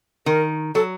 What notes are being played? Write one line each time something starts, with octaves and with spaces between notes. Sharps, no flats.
D#3 A#4
F#3 A4